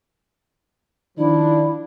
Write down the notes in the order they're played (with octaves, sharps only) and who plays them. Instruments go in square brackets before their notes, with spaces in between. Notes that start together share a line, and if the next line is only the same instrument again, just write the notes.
[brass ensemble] D#3 F3 D4 [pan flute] E4